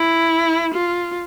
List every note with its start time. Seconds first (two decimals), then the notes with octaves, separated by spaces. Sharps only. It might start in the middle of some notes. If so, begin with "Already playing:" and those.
Already playing: E4
0.74 F4